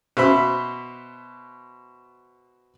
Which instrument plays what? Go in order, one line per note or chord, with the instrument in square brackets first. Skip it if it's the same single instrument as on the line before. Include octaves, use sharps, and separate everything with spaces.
[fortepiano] B2 C5 E5 B5